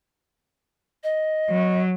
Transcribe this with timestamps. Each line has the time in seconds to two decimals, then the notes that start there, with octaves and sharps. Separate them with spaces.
1.03 D#5
1.50 F#3